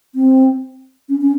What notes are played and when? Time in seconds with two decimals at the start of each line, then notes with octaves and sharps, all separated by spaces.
0.15 C4
1.09 C#4
1.21 C#4